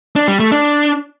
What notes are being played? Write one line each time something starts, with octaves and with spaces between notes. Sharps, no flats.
D4
G3
A3
D4